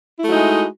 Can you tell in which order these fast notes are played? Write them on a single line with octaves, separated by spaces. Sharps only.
E4 A3 F#4 D#4 G#3